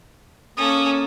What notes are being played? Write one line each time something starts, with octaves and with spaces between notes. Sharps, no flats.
A#3 C#4 A4 D#6